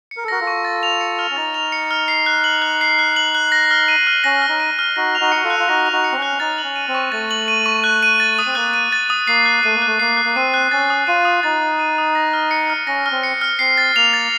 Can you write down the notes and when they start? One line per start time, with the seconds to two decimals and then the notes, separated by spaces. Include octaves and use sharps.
0.11 C#7
0.17 A#4
0.24 A4
0.28 F#4 A#4 A#6
0.40 F4 A4
0.47 C#6
0.65 A6
0.83 F7
1.01 C#7
1.19 F6
1.31 C#4
1.37 D#4 A6
1.54 F7
1.72 C#7
1.91 F6
2.08 C7
2.26 F#6
2.44 F#7
2.62 F#6
2.81 C7
2.99 F#6
3.16 F#7
3.35 F#6
3.52 A#6
3.71 F6
3.88 D#7
4.07 F6
4.24 C#4 A#6
4.42 F6
4.49 D#4
4.60 D#7
4.79 F6
4.96 D#4 F#4 A#6
5.15 F7
5.20 D#4 F#4
5.32 F#4 C#7
5.44 F4 A4
5.50 F#6
5.60 F4
5.68 D#4 F#4 A#6
5.87 F7
5.92 D#4 F#4
6.04 C#7
6.12 C4
6.17 C#4
6.22 F#6
6.40 D#4 A6
6.58 F#7
6.64 C#4
6.76 D#7
6.88 C4
6.95 C#6
7.12 A3 A6
7.31 F#7
7.48 D#7
7.66 C#6
7.84 F#6
8.03 D#7
8.20 A6
8.39 D#6
8.46 C4
8.55 A#3 F#6
8.74 D#7
8.92 A6
9.10 D#6
9.27 A#3 C7
9.46 F#6
9.63 A3 D#7
9.75 A#3
9.82 A3 F#6
10.00 A#3 C7
10.17 F#6
10.25 A#3
10.35 C4 D#7
10.54 F#6
10.71 C#4 A6
10.90 D#6
11.07 F4 D#7
11.25 D#6
11.43 D#4 A6
11.62 D#6
11.79 D#7
11.98 D#6
12.15 A#6
12.33 F6
12.51 C#7
12.70 F6
12.87 C#4 A#6
13.06 F6
13.11 C4
13.23 C#7
13.41 F6
13.59 C4 C7
13.78 A6
13.96 A#3 F7
14.13 A6